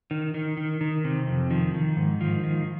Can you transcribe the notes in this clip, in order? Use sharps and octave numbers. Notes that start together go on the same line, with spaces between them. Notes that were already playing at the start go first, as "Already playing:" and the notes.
D#3
D#3
D#3
D#3
C3
F2
D#3 F3
D#3
G#2
D#3 F3
D#3